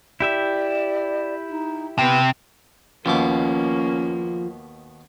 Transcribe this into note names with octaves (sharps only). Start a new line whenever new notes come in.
E4 G4 D5 E5
D#4
C3 B3
D#2 B2 F3 A#3 C#4 D6